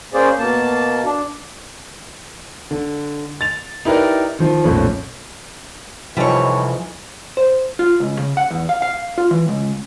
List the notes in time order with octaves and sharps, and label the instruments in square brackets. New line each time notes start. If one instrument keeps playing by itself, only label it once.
[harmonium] A#3 C#4 G#4 C5 D5
B2 A#3 A5
D4
[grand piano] D3
A6 F7
D#4 E4 G4 A#4 B4 D5
D#3 F3
B1 F2 A#2 A3 C#4
[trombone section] F2 G#2 E3 [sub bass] C3 [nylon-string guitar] F3 D#4 [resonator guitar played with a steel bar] G3 C#5
[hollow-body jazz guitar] C5
F4
C#2
C#3
F#5
E2
F5
F5
F4
E3
C#2